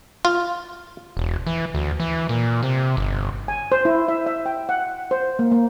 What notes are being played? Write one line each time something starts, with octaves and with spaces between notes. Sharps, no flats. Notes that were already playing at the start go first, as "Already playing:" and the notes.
F4
E1
E3
D2
E3
A#2
C3
G1
G#5
C5
E4
E5
E5
G5
F#5
C5
A#3
A#3